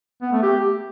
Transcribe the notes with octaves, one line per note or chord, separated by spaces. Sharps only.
B3
A3
G4